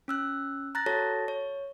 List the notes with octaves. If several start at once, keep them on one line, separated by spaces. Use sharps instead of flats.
C#4 E6 F#6
A#5 F#6 A6 A#6
F#4 A4 C#5 A5 A6 A#6
C#5